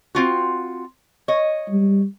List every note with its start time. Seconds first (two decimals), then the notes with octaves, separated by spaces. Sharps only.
0.15 C4 F4 F#4
1.28 C#5 D#5
1.70 G3